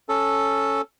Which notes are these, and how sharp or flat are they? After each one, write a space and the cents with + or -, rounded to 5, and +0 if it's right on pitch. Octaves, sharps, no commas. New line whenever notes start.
C#4 +0 A4 +0 A5 +0